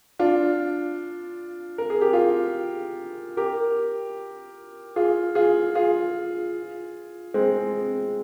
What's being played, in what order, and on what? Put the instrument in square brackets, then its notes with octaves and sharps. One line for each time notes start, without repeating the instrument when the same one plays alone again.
[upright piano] D4 F4
A#4
G#4
G4
F4 G#4
G4 A#4
F4 G#4
F4 G#4
F4 G#4
G#3 C4